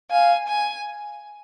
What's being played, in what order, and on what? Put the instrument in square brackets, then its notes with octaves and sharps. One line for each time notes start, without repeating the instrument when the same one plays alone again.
[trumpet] F5 [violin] G#5
[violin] G#5